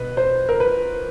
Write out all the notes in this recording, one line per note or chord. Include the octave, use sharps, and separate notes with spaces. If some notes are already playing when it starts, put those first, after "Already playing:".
Already playing: B2 B4
C5
A#4
B4